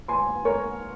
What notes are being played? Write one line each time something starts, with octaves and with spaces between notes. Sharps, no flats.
G#5 C6
A#4 C#5